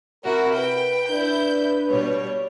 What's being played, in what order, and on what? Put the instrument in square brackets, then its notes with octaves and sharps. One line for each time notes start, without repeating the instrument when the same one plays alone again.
[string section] C3 E4 F#4 [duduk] A#4
[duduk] B4 [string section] G5
[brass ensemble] D4 [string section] E4 G6 [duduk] B4
[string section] B2 G3 C#5